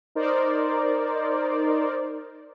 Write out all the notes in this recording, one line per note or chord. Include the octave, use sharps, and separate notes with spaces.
D#4 A#4 C5 D5